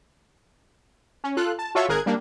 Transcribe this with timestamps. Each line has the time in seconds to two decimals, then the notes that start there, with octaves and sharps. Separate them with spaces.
1.24 C#4
1.37 F4 A4 F#6
1.59 A5
1.75 F4 F#4 A4 C#5 E5 C#6
1.88 G#1 G#4 A#4 F#6 G#6
2.06 G3 A#3 D4